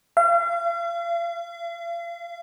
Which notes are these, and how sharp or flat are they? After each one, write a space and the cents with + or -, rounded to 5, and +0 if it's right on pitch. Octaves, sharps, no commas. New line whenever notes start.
F5 -40